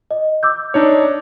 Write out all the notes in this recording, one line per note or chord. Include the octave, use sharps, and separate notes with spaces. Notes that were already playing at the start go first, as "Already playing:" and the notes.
D#5
D6 E6 G6
D4 D#4 C#5